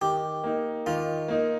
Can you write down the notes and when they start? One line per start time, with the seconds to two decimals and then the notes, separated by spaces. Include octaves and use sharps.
0.01 D#3 G4
0.44 A#3 D#4
0.86 D#3 F4
1.28 A#3 D#4